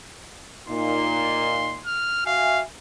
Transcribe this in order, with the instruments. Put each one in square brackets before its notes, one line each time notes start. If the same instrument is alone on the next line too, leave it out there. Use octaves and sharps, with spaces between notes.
[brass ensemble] A#2 D#4 [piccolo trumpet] C6
[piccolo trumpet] F6
[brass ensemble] F#4 E5 G#5 [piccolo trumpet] F5